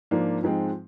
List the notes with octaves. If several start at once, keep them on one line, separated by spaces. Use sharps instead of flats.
G#2 F3 A#3 D4
G#2 F3 G#3 C4